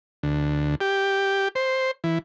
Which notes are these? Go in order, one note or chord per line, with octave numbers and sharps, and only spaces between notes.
D2
G4
C5
E3